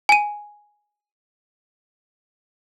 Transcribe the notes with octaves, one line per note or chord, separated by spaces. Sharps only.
G#5 D#7